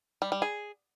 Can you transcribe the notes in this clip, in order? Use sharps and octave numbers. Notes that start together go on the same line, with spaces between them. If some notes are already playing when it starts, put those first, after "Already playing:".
G3
G3
G#4